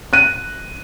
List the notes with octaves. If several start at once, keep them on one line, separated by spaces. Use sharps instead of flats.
F#6 D#7